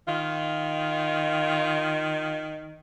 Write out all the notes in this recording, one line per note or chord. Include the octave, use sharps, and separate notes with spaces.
D#3 F4